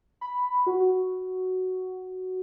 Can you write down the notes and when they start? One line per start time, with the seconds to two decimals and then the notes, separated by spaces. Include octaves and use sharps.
0.21 B5
0.66 F#4